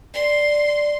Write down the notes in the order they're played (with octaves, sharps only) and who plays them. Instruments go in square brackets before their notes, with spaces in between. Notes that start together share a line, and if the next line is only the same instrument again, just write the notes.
[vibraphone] D5 [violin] C6